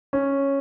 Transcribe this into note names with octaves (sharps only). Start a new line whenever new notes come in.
C#4